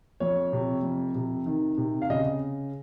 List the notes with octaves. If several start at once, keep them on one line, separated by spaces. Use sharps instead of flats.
F2 C#5
C3
F2
C3
D#3
C3
F5
C#3 D#5